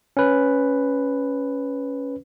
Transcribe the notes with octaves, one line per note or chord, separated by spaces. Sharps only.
C#4 B4